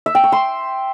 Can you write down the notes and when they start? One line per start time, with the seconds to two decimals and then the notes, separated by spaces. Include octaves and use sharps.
0.06 E5
0.15 G5
0.24 C#6
0.32 C6